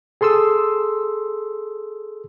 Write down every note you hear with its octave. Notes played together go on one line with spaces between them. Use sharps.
G#4 A4 C6 D#6 E6